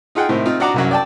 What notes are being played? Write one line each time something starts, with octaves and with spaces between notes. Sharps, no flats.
D#4 F4 G#4 F#5 G5
A2 C3 D#3 C5
C4 D#4 F4
D4 F#4 D#5 F#5 A#5 D6
C2 F#2 F#3
D5 G5 A5